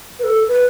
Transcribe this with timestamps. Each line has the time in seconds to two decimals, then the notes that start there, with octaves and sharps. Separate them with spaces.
0.19 B4
0.24 A4
0.48 B4